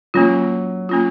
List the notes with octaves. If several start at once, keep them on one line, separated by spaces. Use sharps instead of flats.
F#3 A#3 C#4 F4
A#3 C#4 F4